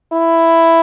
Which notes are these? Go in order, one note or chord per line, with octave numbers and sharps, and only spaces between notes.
E4